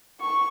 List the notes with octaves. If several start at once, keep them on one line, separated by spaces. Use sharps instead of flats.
C#6